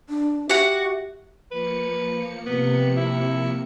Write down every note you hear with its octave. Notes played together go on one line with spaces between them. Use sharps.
D4
F#4 G4 E5 F#5
F3 A#3 B4 C#7
C3 B3
E4